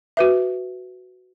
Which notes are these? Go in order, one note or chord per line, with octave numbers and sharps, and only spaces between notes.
F#4 B4 E5